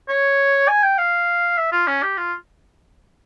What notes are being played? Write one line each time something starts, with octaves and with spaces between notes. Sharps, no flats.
C#5
G#5
G5
F5
E5
F4
C#4
G4
F4